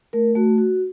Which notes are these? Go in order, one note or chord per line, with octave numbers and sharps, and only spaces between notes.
A3 A#4
A3 F#4
F#4